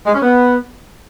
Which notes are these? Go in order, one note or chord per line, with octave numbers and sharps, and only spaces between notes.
G#3
C#4
B3